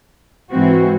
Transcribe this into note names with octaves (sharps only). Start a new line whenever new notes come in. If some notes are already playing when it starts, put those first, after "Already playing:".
G#2 E3 C4 F#4